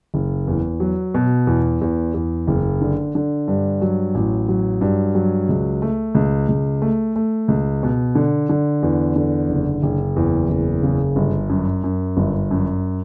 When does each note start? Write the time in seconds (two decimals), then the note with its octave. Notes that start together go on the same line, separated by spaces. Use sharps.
0.14 F#1
0.47 E2
0.80 F#3
1.14 B2
1.47 E2
1.81 E2
2.14 E2
2.47 F#1
2.81 D3
3.15 D3
3.48 G2
3.82 F#3
4.15 A1
4.49 F#3
4.81 G2
5.15 F#3
5.49 C#2
5.82 A3
6.15 C#2
6.48 C#2
6.82 A3
7.16 A3
7.48 C#2
7.83 B2
8.15 D3
8.49 D3
8.83 E2
9.16 D3
9.49 F#1
9.83 F#1
10.16 E2
10.49 F#1
10.83 C#3
11.16 G1
11.49 F#2
11.84 F#2
12.17 G1
12.51 F#2